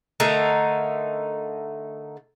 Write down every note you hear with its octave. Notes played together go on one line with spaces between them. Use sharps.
D3 A3 D#4 A#4